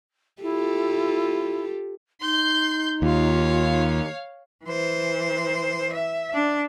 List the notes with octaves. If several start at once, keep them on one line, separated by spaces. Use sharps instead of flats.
E4 F4 G4 A4
D#4 C6 G6
D#2 F4 C#5 F5
E3 C5
E5
D4